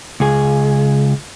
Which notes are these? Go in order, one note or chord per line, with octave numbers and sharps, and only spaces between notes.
C#2 G#4